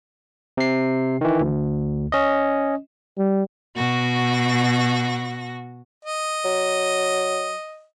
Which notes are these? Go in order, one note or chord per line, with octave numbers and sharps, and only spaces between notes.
C3 C7
D#3 E3
D2
C#4 D#5
G3
B2 F#4 A#6
D#5
F#3